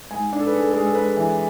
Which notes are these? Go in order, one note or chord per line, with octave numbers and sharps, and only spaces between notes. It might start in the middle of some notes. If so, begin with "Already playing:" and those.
G#2 G#5
D4
A4
B4
G#3 A4
A4
G#3
A4
G#3 B4
E3